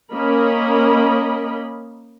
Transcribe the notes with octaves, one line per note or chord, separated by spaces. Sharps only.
A#3 C#4 A#4 D#5 B5